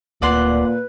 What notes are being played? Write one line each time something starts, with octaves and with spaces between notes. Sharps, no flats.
D1 D2 A#2 C4 B4 D5 F#5 C6